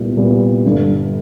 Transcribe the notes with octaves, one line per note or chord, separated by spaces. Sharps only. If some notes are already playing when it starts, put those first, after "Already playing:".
Already playing: C2 A#2 G3 B3
C2 A#2 G3 B3
G1 G2 D3